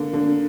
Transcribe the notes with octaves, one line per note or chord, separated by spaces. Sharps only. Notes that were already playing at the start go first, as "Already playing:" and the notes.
Already playing: D3 A#3
D3